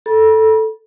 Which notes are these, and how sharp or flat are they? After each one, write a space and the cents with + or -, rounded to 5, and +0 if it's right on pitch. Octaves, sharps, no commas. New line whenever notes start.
A4 +0 B5 -40